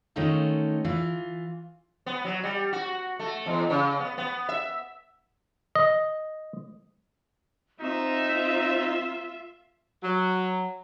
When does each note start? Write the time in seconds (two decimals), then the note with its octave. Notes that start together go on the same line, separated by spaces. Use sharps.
0.16 D#3 A3 C#4 D#4 F4 A4
0.85 E3 F4
2.06 B3
2.25 F#3
2.44 G3
2.73 F#4
3.19 A3
3.46 E2
3.70 C#3
4.00 B3
4.18 B3
4.49 E5
5.75 D#5
7.81 C4 D#4 F4 E5
10.03 F#3